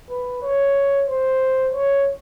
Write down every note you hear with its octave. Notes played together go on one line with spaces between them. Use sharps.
B4
C#5
C5
C#5